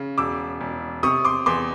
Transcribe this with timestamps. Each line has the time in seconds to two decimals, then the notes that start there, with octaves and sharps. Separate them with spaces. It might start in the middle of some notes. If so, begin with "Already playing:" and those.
Already playing: C#3
0.18 E1 D6 E6
0.61 E1
1.03 C3 C#6 D#6
1.25 C6 D6
1.46 E2 C6 D6